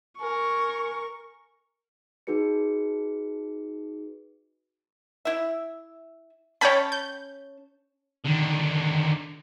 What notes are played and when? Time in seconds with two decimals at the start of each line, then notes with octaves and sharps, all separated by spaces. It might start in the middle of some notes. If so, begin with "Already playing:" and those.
0.21 A#4 G#5 C#6
2.27 D#4 F#4 G#4 B4 C#7
5.25 E4 E5
6.61 C#4 C#5 G5 A5 B5
6.92 G6
8.24 D3 D#3